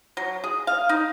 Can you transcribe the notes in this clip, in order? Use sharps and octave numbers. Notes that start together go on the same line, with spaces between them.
F#3
G#4
F5
D#4